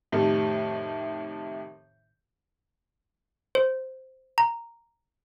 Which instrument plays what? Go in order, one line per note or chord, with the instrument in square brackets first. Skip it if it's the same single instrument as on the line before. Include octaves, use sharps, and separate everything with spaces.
[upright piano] F2 A2 C3 D#3 G3 A3
[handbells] C5
A#5